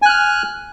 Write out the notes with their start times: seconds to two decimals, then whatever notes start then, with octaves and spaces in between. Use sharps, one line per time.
0.02 G#5
0.06 F#6
0.09 F6